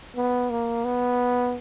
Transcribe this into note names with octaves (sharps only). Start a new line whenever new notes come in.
B3
A#3
B3